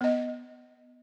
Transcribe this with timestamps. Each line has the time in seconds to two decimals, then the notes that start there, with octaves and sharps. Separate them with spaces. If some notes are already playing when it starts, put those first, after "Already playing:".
0.01 B3 D#5